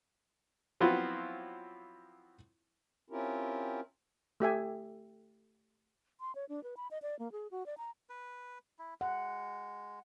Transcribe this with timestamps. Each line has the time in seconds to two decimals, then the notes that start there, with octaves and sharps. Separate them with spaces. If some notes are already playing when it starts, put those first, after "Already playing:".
0.80 F3 F#3 B3 C4 E4 F4
3.10 C4 C#4 E4 F4 G4 A#4
4.40 A3 G4 E5 G#5
6.20 C6
6.35 C#5
6.49 D4
6.64 B4
6.77 B5
6.91 D#5
7.02 D5
7.19 A#3
7.32 G#4
7.51 F#4
7.66 D5
7.78 A#5
8.10 B4
8.79 E4
9.01 G#3 F#5